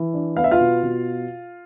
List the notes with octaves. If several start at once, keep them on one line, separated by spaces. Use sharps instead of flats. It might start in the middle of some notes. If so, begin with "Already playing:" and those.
Already playing: E3
D4
B3 F5
E5
F4 F5
B2
B2